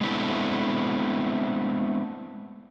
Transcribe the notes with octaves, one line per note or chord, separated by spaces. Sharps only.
G#3 A3 B3 C4 D4 E4